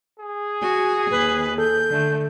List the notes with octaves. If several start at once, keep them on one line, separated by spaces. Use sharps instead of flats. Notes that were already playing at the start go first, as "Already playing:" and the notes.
G#4
F#4 G#5
D#2 B4
A4 G6
D3 A3